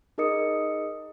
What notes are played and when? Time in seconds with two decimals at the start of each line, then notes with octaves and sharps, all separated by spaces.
0.18 D#4 G#4 A#4 D#5 D#6 C#7